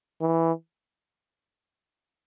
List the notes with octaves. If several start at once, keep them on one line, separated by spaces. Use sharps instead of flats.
E3